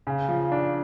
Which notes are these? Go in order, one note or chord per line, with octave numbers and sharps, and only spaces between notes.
C#3
F3
D4